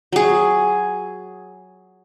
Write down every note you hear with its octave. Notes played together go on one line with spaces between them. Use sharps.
F#3 G#4